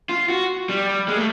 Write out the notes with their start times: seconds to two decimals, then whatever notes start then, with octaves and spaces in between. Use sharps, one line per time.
0.09 F4
0.30 F#4
0.69 G3
1.08 G#3
1.17 A3